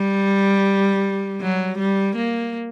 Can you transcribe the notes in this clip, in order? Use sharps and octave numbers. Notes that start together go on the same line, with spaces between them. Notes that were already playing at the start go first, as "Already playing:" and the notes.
Already playing: G3
F#3
G3
A#3